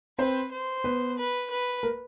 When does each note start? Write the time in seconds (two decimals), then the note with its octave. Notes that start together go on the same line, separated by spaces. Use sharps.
0.19 C4 B4 C5
0.51 C5
0.84 B3 B4
1.18 B4
1.50 B4
1.83 A#3 A#4